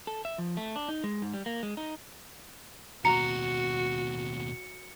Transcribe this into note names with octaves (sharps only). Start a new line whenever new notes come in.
A4
E5
F3
A3
D4
D#4
G#3
G#2
G3
A#3
G#3
D#4
D#2 B2 F#4 A#5 C#7